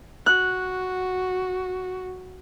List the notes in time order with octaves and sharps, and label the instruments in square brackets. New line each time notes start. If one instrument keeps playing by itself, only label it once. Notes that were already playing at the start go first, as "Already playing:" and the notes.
[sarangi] F#4 [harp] F#6